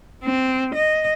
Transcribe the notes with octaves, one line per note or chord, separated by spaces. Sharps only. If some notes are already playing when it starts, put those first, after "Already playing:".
C4
D#5